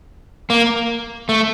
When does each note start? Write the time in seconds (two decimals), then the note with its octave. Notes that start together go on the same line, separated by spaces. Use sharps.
0.50 A#3
1.29 A3